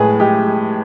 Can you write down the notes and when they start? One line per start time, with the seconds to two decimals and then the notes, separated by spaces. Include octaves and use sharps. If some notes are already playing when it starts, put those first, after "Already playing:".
Already playing: A2 G#3 G#4 B4
0.20 G#3 G4